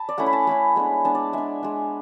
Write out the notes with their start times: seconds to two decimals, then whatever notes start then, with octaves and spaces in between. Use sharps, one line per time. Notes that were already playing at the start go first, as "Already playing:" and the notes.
Already playing: A5 B5
0.09 D5
0.18 A3 C#4 E4 F#5
0.26 B5
0.33 A5
0.47 A3 C#4 E4 B5
0.76 G#3 B3 D4
1.04 G#3 B3 D4 A5
1.15 D5
1.33 G#3 D4 E5
1.63 G#3 D4